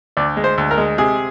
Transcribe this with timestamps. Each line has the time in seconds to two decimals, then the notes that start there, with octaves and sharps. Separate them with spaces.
0.17 D2 D5
0.37 G#3
0.44 C5
0.58 D2
0.71 A#4
0.78 G#3
0.98 C3 G#4